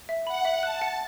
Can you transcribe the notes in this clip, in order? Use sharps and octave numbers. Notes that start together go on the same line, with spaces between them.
E5
F#5 B5
E5
A5 F#6
F#5